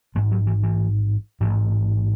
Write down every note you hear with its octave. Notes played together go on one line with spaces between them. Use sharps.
A1 G#2 G#3
F#3
E3
E3
A1 G#2 E3